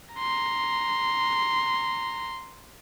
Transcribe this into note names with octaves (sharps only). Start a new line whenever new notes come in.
A#5 C6